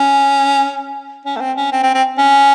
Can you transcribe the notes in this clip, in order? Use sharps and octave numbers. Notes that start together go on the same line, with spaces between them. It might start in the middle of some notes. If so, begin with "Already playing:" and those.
Already playing: C#4
C#4
A3
C4
C#4
C4
C4
C4
C#4